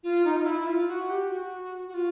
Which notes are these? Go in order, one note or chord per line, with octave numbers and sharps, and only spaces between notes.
F4
D#4
F4
E4
F4
F#4
G4
F#4
F#4
F4